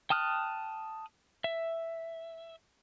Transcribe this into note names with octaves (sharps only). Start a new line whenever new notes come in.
G5 A5 D#6 F6 F#6
E5